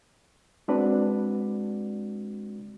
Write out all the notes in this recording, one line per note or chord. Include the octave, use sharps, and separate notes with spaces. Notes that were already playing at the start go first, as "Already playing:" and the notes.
G#3 C4 D4 F#4 B4 D5